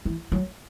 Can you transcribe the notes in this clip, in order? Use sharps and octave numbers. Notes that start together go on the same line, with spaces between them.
E3
F#3